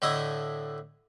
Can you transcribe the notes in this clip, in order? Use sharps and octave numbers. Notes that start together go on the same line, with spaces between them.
A2 D3 A3 E4 D#5 D#6